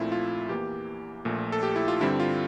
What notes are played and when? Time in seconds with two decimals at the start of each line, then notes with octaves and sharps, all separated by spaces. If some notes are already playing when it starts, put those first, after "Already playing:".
Already playing: A#1 A#2 A3 C4 E4 F4
0.12 F4
0.49 E2 E3 A#3 G4
1.25 A#1 A#2 A3
1.52 A4
1.63 G4
1.76 E4
1.88 F4
2.01 G2 D3 G3 C4 E4
2.20 F4